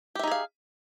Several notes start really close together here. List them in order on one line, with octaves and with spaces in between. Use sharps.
G4 E5 D#4 G#4 F5